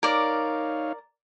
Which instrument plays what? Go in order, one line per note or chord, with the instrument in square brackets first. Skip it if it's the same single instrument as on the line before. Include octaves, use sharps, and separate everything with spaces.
[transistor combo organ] D#4 C#5 F5 [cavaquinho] A#4 D5